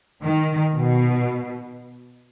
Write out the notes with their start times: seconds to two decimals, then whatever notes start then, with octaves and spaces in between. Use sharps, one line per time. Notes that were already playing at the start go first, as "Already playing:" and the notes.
0.22 D#3
0.74 B2